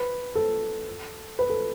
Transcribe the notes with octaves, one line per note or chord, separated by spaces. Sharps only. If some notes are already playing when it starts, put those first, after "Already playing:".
Already playing: B4
A4
B4
A4